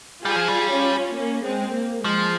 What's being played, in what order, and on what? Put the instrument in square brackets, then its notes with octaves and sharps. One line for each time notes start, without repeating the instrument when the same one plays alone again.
[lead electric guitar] G3 [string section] F4 G#4
[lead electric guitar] F3
G3
[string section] C#4 F4
A#3 C#4
G#3 C4
A#3
[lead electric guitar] F3 [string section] G#3